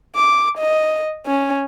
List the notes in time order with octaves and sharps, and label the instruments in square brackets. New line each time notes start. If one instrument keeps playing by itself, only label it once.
[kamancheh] D6
D#5
C#4